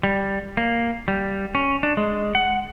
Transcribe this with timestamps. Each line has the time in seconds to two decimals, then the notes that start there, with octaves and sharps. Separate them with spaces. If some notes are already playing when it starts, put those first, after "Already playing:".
0.03 G3
0.57 A#3
1.08 G3
1.55 C#4
1.83 D4
1.97 G#3
2.35 F#5